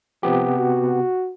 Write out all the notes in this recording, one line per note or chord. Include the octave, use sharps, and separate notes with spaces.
C3 F3 B3 G4
F#4